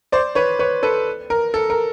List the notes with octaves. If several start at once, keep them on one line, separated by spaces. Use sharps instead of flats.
C5 D5
B4 C#5
B4 C#5
A4 B4
A#4
A4
A#4